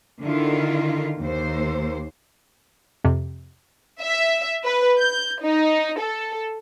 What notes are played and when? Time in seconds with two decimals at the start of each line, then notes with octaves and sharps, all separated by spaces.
0.22 D3 D#3 E4 F4
1.20 D#2 C5
3.04 F2 C3
4.01 E5
4.64 B4
4.98 G6
5.42 D#4
6.00 A4